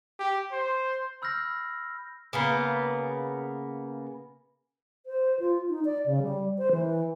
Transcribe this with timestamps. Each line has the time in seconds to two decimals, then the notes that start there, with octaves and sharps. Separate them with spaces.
0.19 G4
0.52 C5
1.22 B5 E6 F6 G6 A#6 C7
2.33 C#3 A#3 B3
5.06 C5
5.40 F4
5.69 D#4
5.85 D5
6.06 C#3
6.23 G3
6.58 C5
6.72 E3